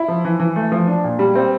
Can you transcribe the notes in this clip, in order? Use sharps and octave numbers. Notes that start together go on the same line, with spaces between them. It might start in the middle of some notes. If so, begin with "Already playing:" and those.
Already playing: E4
F3
E3
E3
A3
F3
D4
A#2
G3
C4